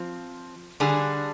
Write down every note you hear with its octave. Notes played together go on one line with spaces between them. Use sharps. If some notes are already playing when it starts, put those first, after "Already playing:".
Already playing: F3 C4
D3 G3 D4 G#4